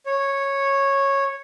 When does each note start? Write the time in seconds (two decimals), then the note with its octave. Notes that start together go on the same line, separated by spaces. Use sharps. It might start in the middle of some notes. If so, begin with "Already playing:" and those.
0.06 C#5